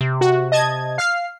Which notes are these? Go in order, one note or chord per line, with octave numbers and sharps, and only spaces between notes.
C3
F#4
D#5 A5 G#6
F5 F6 C7